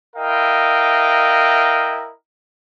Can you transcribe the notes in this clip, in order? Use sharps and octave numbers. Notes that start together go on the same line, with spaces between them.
E4 A#4 D#5 F5 G5